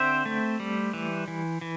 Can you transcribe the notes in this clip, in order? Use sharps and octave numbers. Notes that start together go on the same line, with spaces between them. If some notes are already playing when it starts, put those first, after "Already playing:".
Already playing: D3 C4 C5 E5
A3
G3
E3
E3
E3